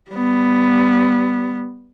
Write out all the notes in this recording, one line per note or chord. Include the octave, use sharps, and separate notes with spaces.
G3 B3